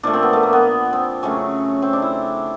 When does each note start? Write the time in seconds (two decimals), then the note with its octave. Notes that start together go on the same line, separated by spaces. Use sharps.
0.03 A#2 F3 A3 D4
0.13 C4
0.23 B3
0.33 A3
0.43 A#3
0.53 B3
0.93 C4
1.23 C#3 F#3 A3 C#4
1.82 C4
1.93 D4
2.02 E4